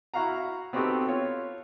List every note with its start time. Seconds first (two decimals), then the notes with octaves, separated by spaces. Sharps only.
0.14 E4 F#4 F5 F#5 A#5
0.73 B3 C4 D#4 F#4 G4 A4
1.08 F4 C#5